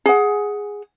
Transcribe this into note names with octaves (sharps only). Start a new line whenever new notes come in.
G#4 F#5